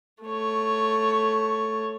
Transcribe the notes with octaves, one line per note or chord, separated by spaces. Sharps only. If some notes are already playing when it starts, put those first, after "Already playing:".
A3 C#5